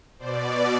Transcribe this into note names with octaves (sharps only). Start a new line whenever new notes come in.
B2 C5 D5